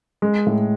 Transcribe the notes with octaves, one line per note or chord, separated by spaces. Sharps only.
G#3
A2